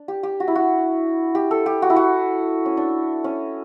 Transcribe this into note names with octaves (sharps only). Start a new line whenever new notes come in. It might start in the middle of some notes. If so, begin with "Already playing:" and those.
Already playing: D4
G4
G4
F#4
E4
F#4
G4
A4
G4
F#4
E4
F#4
C#4
D4
C#4